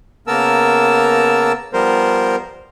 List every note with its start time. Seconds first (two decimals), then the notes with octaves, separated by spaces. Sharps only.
0.27 C#3 A#3 B3 A#4 A5 E6
1.73 F3 G3 B3 A#4 C5